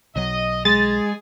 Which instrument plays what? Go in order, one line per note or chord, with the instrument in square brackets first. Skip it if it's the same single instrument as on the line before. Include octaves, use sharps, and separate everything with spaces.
[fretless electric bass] B1 F#3 [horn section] D#5
[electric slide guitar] G#3 [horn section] G#4 [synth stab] A6